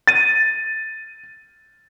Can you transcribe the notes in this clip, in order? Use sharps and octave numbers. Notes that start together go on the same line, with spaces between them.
A6 D#7